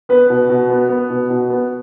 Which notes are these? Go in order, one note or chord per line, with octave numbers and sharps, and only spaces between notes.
B3 B4
B2
B2
B3
B3
B2
B2
B3